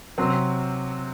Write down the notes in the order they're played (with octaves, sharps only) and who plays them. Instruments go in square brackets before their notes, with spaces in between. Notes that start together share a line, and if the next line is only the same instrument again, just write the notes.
[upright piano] C3 F#3 C4